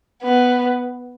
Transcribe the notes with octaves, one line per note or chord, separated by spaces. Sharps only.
B3